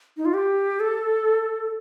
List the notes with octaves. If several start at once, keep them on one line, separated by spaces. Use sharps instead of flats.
D#4
F4
G4
A4